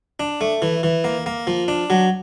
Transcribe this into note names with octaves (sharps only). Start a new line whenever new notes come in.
D4
A3
E3
E3
A#3
A#3
F3
D4
F#3